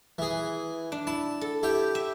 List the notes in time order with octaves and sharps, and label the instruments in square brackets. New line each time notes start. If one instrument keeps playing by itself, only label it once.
[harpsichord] E3 G#4
[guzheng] D4
[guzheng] E4 [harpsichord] A5
[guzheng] A4
[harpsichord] E4 G4 G5
[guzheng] E5